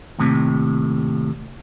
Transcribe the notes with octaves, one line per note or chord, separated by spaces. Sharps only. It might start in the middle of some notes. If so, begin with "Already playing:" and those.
D#2 A2 C3